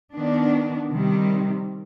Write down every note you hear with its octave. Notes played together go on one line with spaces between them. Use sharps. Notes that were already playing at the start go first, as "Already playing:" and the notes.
D#3 B3 D4
C3 D#3 G3